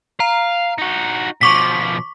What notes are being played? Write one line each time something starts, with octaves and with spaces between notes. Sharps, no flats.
F5 A#5
D#4 F#4
B2 F3 C#6 D6 B6